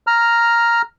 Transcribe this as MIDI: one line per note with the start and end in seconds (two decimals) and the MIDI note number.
0.07 0.82 82
0.07 0.82 89